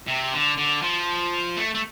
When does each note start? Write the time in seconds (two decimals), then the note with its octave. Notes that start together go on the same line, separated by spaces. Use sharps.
0.08 C3
0.33 D3
0.57 D3
0.82 F3
1.57 A3
1.75 A3